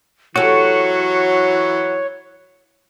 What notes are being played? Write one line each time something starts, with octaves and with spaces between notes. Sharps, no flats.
E3 F#3 F#4 G4 A4 C#5